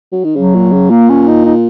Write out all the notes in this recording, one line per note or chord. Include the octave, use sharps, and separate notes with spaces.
F#3
D#3
C#3 F#3
A#2
C#3
A#2 A#3
C#4
D#4
D#4